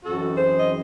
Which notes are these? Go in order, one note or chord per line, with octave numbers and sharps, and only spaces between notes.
F#2 E3 C4 D#4 F#4 A4
G#4 C5
D#5